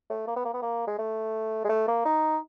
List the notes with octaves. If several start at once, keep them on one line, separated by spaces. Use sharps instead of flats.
A3
A#3
B3
A#3
B3
A#3
G#3
A3
G#3
A3
A#3
D#4